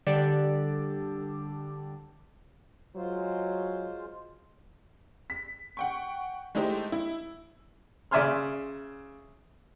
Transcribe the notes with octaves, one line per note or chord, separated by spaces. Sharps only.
D3 G3 D4 G4 A4 D5
F#3 G#3 F4 C5
B6
F#5 G5 C#6
G#3 A3 D#4 E4 G4 C5
E4
C#3 D5 E5 G#5 C6 F6